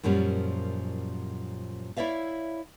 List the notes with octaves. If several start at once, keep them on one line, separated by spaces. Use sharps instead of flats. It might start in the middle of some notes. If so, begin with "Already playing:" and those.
F#2 A#2 F3 G3 C#4
E4 C#5 D5 E5 F5